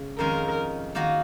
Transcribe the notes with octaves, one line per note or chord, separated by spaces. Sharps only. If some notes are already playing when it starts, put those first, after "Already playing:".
Already playing: C#3
F2 D#3 G#3 C#4 A#4
D#3 A#3 D#4 F#4